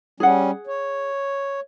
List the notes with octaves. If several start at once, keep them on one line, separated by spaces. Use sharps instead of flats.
G3 C#4 G#4 F#5
C#5